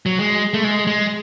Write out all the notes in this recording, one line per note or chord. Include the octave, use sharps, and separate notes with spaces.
F#3
G#3
A3
G#3
G#3